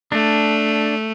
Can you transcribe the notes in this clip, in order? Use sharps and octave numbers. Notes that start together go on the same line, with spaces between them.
A3 D4